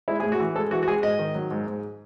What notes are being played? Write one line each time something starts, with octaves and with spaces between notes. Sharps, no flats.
G#3 E4
A2 G#4
F#4
E3
G#3 A4
E3 F#4
F#4
G#3 G#4
G#2 D#5
D#3
F#3
G#2
G#2